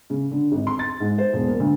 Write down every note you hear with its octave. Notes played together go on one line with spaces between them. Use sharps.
C#3
D3
G#1
C6
A6
G#2
C5
E1
A#3
D2